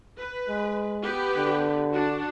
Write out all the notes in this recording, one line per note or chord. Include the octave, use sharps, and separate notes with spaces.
B4
G#3
B3 G4 B4
D3
D4 F#4